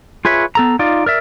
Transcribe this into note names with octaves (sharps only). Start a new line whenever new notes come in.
F4 G#4 B4 C#5 E5
B3 A4 A#5
D#4 F4 D5
A#4 D5 E5